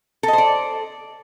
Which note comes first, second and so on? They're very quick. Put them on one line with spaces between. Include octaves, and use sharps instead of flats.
A4 D#5 C5 D5